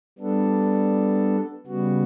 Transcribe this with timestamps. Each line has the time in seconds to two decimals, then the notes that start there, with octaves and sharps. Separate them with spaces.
0.18 G3 B3 D4 A4
1.66 C#3 G3 B3 F#4